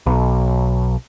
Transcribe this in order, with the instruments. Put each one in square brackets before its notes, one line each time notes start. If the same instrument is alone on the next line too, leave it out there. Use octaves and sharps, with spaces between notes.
[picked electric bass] B1